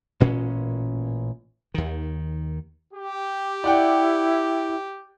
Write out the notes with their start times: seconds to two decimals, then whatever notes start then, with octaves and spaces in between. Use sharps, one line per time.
0.20 A1 A#2 C#4
1.74 D#2 D#3
2.93 G4
3.64 E4 D5 F#5 G5